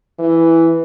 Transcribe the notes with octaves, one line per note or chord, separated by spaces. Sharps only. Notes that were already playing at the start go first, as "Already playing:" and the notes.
E3